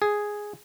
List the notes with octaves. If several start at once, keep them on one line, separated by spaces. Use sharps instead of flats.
G#4